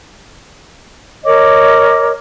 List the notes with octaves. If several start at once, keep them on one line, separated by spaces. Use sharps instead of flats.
A#4 C#5 D#5 D6